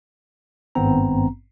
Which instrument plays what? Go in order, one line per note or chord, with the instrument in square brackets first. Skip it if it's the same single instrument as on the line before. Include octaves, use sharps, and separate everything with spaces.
[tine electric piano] G#1 G2 B3 C4 A#5